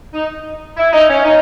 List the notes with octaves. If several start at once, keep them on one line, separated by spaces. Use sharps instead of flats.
D#4
E4
D#4
C#4
D#4